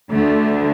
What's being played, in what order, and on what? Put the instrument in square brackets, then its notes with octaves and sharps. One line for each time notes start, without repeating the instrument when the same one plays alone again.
[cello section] D2 D3 A3